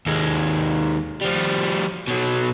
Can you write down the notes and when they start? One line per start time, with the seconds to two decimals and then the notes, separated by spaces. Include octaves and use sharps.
0.06 D#2 G#3
1.21 F3 G3
2.08 B2 F#3